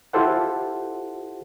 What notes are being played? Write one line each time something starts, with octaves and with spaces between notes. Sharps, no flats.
E4 F4 G4 A4 C5 F#5